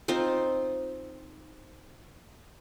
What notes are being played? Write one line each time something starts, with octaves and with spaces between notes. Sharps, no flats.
C4 D#4 F4 C5